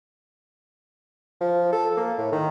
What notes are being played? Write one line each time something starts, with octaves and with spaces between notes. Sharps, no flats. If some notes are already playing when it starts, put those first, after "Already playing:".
F3
A4
A#3
A2
D#3